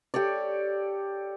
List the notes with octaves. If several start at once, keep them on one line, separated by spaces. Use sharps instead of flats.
G4 A4 C#5 D5